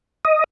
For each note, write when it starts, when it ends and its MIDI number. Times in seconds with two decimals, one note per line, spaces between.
0.25 0.44 75